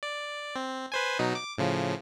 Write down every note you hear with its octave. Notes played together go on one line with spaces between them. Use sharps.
D5
C4
B4 C5 G#5
B2 F#3 D#4
D6
A2 C#3 F3